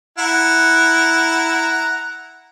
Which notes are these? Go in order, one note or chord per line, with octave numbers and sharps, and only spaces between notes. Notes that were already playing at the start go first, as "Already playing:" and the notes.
E4 F#5 A#5